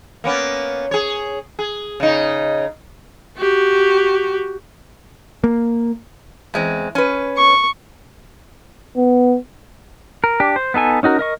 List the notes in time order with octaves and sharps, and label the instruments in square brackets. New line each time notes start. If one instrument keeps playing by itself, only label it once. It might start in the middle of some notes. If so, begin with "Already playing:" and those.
[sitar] A#3 B3 C#4
G#4 C#5
G#4
C#3 D#4
[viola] F#4 G4
[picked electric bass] A#3
[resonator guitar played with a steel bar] E2 G#3 C4
C#4 B4
[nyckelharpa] C#6
[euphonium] B3
[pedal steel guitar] A#4
D4 G4
C5
B3 D#4 A4 G#5
C#4 D#4 F#4 A#4
A#4 D#5 C#6